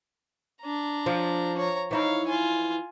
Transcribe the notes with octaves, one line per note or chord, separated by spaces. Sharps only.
D4 A#5
F3
C#5 A#5
E3 D#4 E4 C#5 F5
F4 G#5